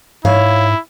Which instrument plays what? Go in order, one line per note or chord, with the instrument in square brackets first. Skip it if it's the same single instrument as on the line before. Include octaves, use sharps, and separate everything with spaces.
[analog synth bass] G#2 [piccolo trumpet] E4 [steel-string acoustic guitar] C#5 F5